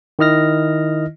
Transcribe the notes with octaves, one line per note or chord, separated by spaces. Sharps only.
D#3 E4 D#5 F6 A#6